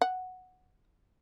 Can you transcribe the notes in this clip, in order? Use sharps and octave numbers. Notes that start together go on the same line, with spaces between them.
F#5